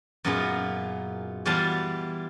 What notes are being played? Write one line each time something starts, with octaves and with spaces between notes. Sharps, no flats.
F#2 A#2 B3 D#4 F4 G#4
E3 G3 B3 F4 F5 A5